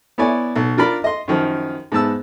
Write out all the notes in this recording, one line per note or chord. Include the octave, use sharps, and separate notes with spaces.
B3 E4 C#5 D5 G#5
B1
D4 F4 A#4 D5 B5
D#5 C6
F#2 D#3 F3
G#2 B3 A5 E6